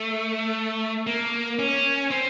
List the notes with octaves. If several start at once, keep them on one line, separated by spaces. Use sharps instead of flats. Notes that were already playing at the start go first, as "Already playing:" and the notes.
Already playing: A3
A#3
C#4
C4